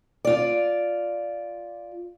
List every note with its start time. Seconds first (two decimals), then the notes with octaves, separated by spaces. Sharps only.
0.25 F4 D5